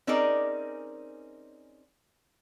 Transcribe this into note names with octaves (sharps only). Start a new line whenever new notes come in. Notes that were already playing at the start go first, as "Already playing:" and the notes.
C4 C#4 D#4 G#4 A#4 D5